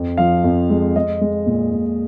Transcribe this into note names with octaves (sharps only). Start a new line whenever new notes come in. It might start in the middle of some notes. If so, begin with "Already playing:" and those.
Already playing: F2
F3 F5
F2
G#3
G#3 D#5
G#3
A#2
A#2